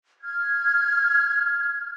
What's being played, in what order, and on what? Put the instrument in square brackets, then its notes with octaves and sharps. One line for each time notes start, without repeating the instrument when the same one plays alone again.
[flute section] F6 G#6